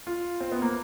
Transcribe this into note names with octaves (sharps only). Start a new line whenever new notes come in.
F4
C4
B3
A#3